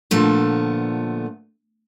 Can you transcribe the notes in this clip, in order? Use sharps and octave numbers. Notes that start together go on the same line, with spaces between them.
A#2 D3 F3 A3 B3